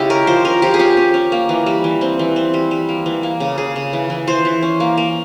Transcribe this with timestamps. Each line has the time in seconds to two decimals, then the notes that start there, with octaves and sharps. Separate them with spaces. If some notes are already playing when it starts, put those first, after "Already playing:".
Already playing: C#3 G#3 E4 G4
0.10 C#4 A#4
0.27 F3 C5
0.45 C#4 A#4
0.62 F3 G4
0.74 G#4
0.79 C#4 G4
0.97 C#4
1.14 C#4
1.32 A#3
1.49 E3
1.66 G3
1.84 E3
2.01 C4
2.19 E3
2.36 C4
2.54 G3
2.71 G3
2.89 A#3
3.06 E3
3.23 A#3
3.40 C#3
3.58 C#3 G#4
3.76 C#3
3.93 E3
4.10 E3
4.27 E3 C5
4.45 E3
4.63 C#4
4.80 A#3
4.98 A#3